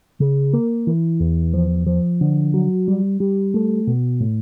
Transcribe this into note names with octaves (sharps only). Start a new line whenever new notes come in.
C#3
A#3
E3
E2
F3
F3
D3
F#3
G3
G3
A3
B2
A2